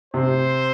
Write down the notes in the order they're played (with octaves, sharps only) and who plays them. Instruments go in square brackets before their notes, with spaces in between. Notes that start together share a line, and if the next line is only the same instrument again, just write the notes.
[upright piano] C3 [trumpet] C5